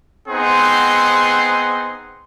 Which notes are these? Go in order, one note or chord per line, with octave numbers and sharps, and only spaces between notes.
B3 C4 D#4 G#4 F#5 C6